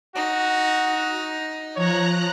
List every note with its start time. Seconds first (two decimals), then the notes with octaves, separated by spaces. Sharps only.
0.16 D#4 F#4
1.76 F3 C#5 A#5 F#6